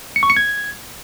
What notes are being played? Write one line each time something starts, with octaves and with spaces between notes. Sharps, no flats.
C#7
C#6
C#7
G#6